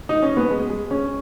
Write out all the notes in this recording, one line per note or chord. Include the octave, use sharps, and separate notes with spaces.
D#4
C#4
B3
G#3
G#3
C#4